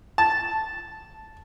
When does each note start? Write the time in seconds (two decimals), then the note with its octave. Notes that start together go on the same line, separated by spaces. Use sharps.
0.18 A5